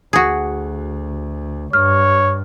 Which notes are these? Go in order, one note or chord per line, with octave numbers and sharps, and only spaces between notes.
D2 F#4 G#4
G2 C#5 F6